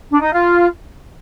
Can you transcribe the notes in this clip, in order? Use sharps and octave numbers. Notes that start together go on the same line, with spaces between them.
D4
D#4
F4